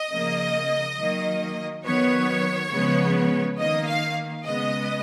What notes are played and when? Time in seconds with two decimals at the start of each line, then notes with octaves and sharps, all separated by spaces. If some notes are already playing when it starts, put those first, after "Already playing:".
Already playing: D#5
0.11 C#3 F3 A#3
0.98 D#3 F#3 A#3
1.85 D#3 F#3 B3 C#5
2.71 C#3 F3 G#3 B3
3.59 D#3 A#3 D#5
3.87 F5
4.45 C#3 G#3 B3 D#5